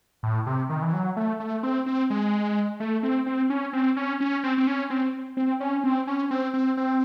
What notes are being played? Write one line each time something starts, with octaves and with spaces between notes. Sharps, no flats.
A2
C3
D#3
E3
F#3
A3
A3
C4
C4
G#3
A3
C4
C4
C#4
C4
C#4
C#4
C4
C4
C#4
C4
C4
C#4
C4
C#4
C4
C4
C4